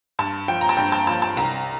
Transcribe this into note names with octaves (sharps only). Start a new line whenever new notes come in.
G2 A5
F3 G5
A#5
A5
G2 G5
A5
F3 A5
A5
C2 A#5